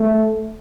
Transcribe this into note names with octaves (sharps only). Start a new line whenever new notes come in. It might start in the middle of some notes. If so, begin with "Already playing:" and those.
Already playing: A3